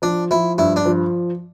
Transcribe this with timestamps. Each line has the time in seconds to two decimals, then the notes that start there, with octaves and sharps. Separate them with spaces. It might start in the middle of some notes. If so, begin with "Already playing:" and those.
0.02 F3 D4
0.31 F3 E4
0.58 G2 E4
0.76 D4
0.86 F3